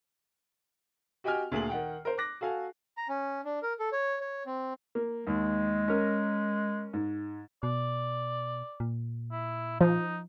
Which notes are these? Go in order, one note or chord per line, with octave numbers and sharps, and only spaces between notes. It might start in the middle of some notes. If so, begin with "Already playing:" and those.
F#4 G4 D#5 G5 G#5 F6
D2 A#2 G#4 G#5 F#7
D#3 F#5 G5
A#4 C5
D6 F#6 A#6
F#4 A4 F5 G#5
A#5
C#4
D4
A#4
A4
C#5
C#5
C4
A#3
D#2 G#3
C#4 A#4
G#2
B2 D5
A#2
E4
F3 D#4